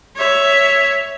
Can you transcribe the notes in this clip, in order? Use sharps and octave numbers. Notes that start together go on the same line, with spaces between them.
C#5 E5